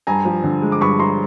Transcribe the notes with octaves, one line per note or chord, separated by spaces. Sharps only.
G2 G#5 A#5
F3
D3
G#3
D6
G2 B5 C#6
F3 A#5 C6